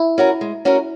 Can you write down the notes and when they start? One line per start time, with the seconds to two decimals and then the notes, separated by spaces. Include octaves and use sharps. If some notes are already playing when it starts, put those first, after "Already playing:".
Already playing: E4
0.18 C#4 F#4 A#4
0.41 G#3
0.65 C#4 F#4 A#4